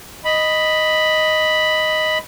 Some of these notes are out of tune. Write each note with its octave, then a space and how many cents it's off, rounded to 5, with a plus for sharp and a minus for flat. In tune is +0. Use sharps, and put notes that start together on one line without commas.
D#5 +0 B5 +0